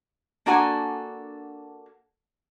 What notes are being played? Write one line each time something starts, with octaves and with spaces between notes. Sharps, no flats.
A#3 D4 F#4 A4 F#5 G#5